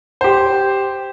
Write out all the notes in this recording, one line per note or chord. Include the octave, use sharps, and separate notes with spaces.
G4 C5